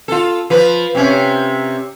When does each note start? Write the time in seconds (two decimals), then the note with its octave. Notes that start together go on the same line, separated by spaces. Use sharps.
0.08 F4 A4
0.50 F3 B4
0.95 C3 C#4